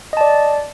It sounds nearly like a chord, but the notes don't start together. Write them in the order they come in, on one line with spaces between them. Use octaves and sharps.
D#5 A5 D5